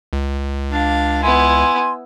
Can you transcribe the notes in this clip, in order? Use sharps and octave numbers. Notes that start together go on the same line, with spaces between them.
C#2
D4 F5
B3 E4 G#5 C6